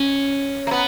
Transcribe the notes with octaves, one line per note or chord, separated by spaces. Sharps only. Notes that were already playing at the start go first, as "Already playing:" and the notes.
Already playing: C#4
A#3
B3